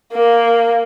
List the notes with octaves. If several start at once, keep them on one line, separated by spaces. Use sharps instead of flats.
A#3